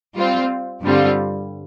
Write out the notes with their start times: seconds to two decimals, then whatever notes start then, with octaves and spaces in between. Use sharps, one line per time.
0.15 G3 C4 F4
0.83 G2 D3 G3 C4 F4